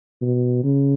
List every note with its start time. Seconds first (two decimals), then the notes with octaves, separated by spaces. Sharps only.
0.21 B2
0.64 C#3